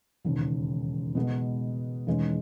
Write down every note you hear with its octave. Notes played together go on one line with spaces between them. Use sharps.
E1 D#2 C#3
B2 G#3 B3
E1 E2 D#3 G#3 C#4